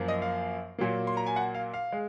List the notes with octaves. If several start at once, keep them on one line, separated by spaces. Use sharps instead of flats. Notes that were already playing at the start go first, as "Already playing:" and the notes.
Already playing: F#2 F3 A#3
D#5
F5
A#2 F#3 A#3
C6
A#5
G#5
F#5
F5
F5
G#3